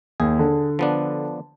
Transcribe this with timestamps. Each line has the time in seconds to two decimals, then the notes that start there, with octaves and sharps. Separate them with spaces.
0.20 D#2 G#4
0.39 D3
0.79 F3 B3 D4